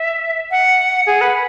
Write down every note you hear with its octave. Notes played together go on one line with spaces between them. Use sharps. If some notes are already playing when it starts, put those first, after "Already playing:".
Already playing: E5
F#5
G#4
B4